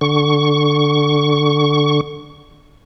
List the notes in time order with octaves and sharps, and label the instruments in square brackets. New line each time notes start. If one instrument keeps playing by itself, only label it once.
[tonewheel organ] D3 C#6